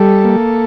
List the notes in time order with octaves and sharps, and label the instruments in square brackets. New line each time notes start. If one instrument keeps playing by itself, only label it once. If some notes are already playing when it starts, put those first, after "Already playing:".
Already playing: [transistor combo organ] G3 A4
A#3